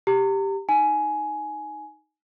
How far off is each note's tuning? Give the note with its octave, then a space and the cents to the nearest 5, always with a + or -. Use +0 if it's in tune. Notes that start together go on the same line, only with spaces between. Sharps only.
G4 +0 A#5 -35
D#4 +0 G#5 +15